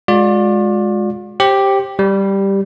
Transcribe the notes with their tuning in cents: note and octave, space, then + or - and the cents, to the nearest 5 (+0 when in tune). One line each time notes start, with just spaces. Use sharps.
G#3 +0 F4 +45 D5 +0
G4 +0 C5 +35
G3 +0 G4 +5